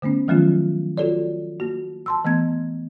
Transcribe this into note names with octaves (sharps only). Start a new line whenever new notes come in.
D3 A3 B3 C#4
D#3 F3 F#3 A3 C#4 F4
F4 F#4 A4 C#5 D5
A#3 F#4
A5 C6 E6
E3 A3 B3 G#6